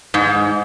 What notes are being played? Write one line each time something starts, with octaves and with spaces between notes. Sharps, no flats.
G#2